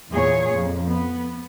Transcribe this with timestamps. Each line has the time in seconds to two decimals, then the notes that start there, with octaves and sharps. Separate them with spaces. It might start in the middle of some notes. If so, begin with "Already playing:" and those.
0.10 E2 A#2 G#4 C#5
0.52 F2
0.88 B3